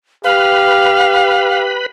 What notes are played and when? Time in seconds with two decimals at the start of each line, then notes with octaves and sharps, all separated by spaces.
0.24 G4 B4 F5 B5